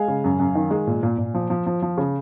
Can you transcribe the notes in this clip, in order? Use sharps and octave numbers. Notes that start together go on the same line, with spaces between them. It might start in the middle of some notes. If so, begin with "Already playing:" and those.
Already playing: G#3 F5 G#5
C#3
F#2
F#2
D#3
G#3
A#2
A#2
A#2
F3
F3
F3
F3
C#3